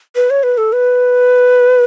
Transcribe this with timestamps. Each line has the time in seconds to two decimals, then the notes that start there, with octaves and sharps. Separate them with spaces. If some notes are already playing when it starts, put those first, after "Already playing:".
0.16 B4
0.30 C#5
0.43 B4
0.58 A4
0.73 B4